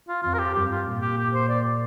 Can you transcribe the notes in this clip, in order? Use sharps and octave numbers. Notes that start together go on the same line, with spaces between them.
F4
F2 F4
A#4
G4
G2 G4
F4
A#2
G4
G4
C5
D5